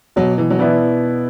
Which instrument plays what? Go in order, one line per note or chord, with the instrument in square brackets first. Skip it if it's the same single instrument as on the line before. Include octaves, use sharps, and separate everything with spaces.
[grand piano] B2 [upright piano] F#3
[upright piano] E3
F#3
[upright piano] E3 [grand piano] B3 E4 D5